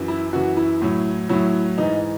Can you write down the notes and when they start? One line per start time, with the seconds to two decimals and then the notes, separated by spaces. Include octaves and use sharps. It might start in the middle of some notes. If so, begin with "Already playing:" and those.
Already playing: F#2 E3
0.08 E4
0.33 F#2 E3 F#4
0.57 E4
0.82 A2 F#3
1.29 A2 F#3 E4
1.78 G#2 E3 D#4